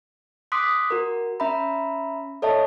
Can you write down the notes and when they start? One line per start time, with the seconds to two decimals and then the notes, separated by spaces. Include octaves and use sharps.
0.52 C6 D6 D#6 F#6 B6
0.91 F#4 A#4
1.40 C#4 E5 A#5 B5
2.42 A4 C#5 D#5 E5 A5